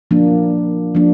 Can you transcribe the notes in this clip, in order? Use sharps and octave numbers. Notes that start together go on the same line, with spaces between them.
F3 A#3 D4
F3 A#3 D4